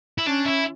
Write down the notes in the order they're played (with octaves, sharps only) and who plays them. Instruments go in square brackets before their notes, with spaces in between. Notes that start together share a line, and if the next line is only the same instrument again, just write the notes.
[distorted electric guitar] E4
[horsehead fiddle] C#4 [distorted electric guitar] D4
[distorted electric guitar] E4